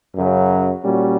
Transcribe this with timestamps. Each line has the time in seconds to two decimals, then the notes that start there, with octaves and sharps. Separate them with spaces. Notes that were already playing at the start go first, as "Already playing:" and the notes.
0.16 F#2 C#3 F#3
0.84 A#2 G3 A#3 C#4 F#4